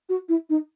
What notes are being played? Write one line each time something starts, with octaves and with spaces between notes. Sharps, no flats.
F#4
E4
D#4